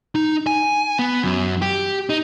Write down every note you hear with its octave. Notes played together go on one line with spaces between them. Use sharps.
D#4
G#5
B3
F#2
G4
D#4